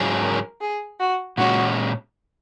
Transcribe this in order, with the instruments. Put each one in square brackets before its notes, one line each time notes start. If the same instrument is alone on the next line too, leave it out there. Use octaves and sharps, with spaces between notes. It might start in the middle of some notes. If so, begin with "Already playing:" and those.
Already playing: [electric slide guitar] G#2 F#3 C#4 G#4
[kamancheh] A#4
G#4
F#4
[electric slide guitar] A#2 G#3 C#4 [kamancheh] F#4